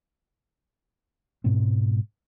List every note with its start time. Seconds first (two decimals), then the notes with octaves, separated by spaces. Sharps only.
1.44 G#2 B2 G#3 C4